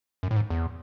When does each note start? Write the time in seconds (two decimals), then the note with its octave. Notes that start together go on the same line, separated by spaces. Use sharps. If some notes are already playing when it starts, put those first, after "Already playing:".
0.23 F#2
0.31 A2
0.36 G#2
0.50 E2